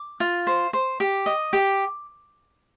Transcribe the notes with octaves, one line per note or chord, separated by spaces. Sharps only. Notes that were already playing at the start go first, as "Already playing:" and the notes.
Already playing: D6
F4
C5
C5
G4
D#5
G4